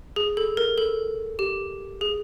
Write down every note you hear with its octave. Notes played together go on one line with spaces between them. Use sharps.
G#4
A4
A#4
A4
G4
G#4